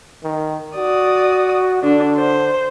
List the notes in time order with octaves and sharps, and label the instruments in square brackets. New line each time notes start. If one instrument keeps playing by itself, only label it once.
[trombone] D#3
[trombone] F#4 [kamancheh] D5 D#6
[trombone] D3 [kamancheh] D4
[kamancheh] C5